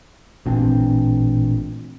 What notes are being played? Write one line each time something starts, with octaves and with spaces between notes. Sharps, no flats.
A1 A#2 C4 D4